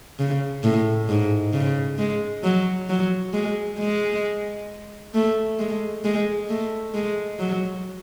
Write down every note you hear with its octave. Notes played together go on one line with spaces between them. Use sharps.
C#3
A2
G#2
C#3
G#3
F#3
F#3
G#3
G#3
A3
G#3
G#3
A3
G#3
F#3